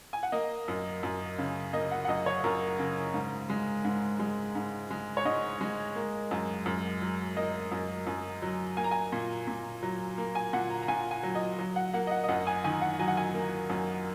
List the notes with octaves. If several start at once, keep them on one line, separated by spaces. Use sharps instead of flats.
G#5
F#5
A#3 D#5
F#2
F#2
C#3
A#3 D#5
F#5
F#5
F#2 D#5
C#5
F#2 A#4
C#3
G#2
G#3
G#2
G#3
G#2
G#3
C#5
G#2 D#5
G#3
A#3
F#2
F#2
F#3
A#3 D#5
F#2
F#2
F#3
A#3 G#5
A#5
G#5
A#2
A#2
F#3
A#3
G#5
A#2 F#5
A#5
A#5
A#2 G#5
G#5
F#3
D#5
F#3
F#5
A#3 F#5
D#5
F#5
D#5
F#2 F#5
G#5
D#3 G#5
F#5
F#3 G#5
F#5
G#5
A#3
F#2